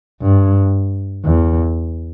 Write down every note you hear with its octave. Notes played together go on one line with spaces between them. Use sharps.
G2
E2